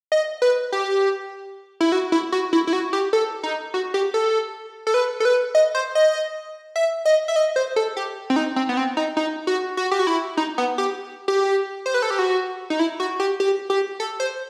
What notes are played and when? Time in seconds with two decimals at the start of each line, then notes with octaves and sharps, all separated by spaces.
0.12 D#5
0.42 B4
0.72 G4
1.81 E4
1.92 F#4
2.12 E4
2.32 F#4
2.53 E4
2.67 E4
2.73 F#4
2.93 G4
3.13 A4
3.43 D#4
3.74 F#4
3.94 G4
4.14 A4
4.87 A4
4.94 B4
5.20 A4
5.25 B4
5.55 D#5
5.75 C5
5.95 D#5
6.76 E5
7.05 D#5
7.28 E5
7.36 D#5
7.56 C5
7.76 A4
7.97 G4
8.30 C4
8.36 D#4
8.56 C4
8.69 B3
8.77 C4
8.97 D#4
9.17 D#4
9.47 F#4
9.77 F#4
9.91 G4
9.99 F#4
10.07 E4
10.37 D#4
10.58 B3
10.78 G4
11.28 G4
11.86 C5
11.94 B4
12.02 A4
12.10 G4
12.19 F#4
12.70 D#4
12.79 E4
13.00 F#4
13.20 G4
13.40 G4
13.70 G4
14.00 A4
14.20 C5